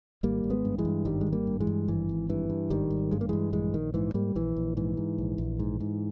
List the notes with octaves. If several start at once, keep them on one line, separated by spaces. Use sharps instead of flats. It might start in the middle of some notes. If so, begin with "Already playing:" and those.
G#1 G3 A#3
G#1
G#3 B3
G2
E3 G#3
G2
G#1 D#3 G3
G#3
G#1
G3 A#3
G2
E3 G#3
G2
G#1 E3
G#1
G2 E3
G2
G#1 D#3 G3
G#1
G2 G#3
A#3
G2 E3 G#3
A#1 E3 G#3
A#1 D#3
G#2 E3
G#2 G3 A#3
A#1 E3
A#1
G#2 E3
G#2
A#1
A#1
G#2
G#2